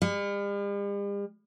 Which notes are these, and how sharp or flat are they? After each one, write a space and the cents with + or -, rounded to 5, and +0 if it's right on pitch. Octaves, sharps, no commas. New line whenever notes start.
G3 +45